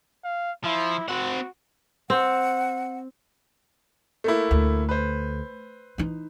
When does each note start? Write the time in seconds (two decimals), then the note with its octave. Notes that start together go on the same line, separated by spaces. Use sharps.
0.24 F5
0.64 F3 E4
1.09 C4 F#4 F#5
2.10 C4 F#5
4.24 A3 A#3 E4
4.51 D2
4.89 B4 C5
5.98 E3 D#4